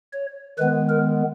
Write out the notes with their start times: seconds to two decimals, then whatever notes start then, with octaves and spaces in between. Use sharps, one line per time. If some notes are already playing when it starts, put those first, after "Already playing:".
0.13 C#5
0.58 D#3 G#3 B3 B4
0.89 A#4